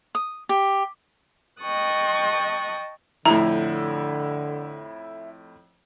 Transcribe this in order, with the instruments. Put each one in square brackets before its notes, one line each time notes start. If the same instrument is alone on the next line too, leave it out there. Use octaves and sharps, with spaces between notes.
[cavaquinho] D#6
G4
[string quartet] D#5 G5 A5 C#6 D#6 F#6
[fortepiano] F2 A2 [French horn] D3 [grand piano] E4 [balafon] A#5